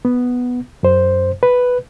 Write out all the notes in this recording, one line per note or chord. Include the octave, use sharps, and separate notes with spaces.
B3
F#2 C5
B4